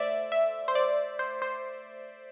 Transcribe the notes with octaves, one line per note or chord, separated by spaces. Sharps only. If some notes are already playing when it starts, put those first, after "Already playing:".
Already playing: A3 C5 D5 E5
E5
C5
D5
C5
C5